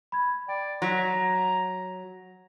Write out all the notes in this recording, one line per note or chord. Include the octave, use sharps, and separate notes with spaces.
B5 G#6
D5 G5
F#3 A#5 A#6 B6